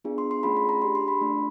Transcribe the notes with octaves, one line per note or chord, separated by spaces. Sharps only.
B3 D4 F4 G#4
C6
C6
A3 C#4 F4 G#4 B5
B5
A#5
D4 G4 C6
C6
B5
A3 D4 F4